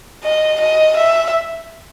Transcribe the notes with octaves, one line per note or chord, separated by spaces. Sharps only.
D#5
D#5
E5